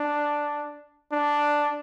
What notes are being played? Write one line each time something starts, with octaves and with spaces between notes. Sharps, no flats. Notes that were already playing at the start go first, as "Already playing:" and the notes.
Already playing: D4
D4